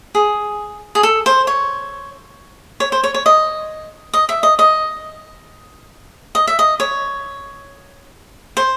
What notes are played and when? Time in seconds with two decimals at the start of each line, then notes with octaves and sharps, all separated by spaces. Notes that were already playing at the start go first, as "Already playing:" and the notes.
0.15 G#4
0.95 G#4
1.03 A4
1.26 C5
1.47 C#5
2.80 C#5
2.92 C5
3.03 C#5
3.14 C#5
3.26 D#5
4.13 D#5
4.29 E5
4.43 D#5
4.59 D#5
6.35 D#5
6.47 E5
6.59 D#5
6.80 C#5
8.57 C5